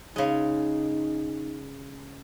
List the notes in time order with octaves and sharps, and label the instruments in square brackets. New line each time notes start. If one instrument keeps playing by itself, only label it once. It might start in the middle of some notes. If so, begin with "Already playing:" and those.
[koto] C#3 G#3 [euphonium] D#4